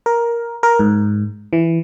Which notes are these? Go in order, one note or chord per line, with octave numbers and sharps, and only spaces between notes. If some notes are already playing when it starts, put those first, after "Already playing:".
A#4
A#4
G#2
E3